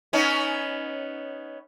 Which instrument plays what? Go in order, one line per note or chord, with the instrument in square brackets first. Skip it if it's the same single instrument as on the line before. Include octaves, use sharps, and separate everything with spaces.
[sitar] B3 C#4 D#4